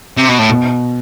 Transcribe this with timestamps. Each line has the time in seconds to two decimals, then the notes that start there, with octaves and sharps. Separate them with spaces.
0.17 C3
0.29 B2
0.39 A2
0.49 B2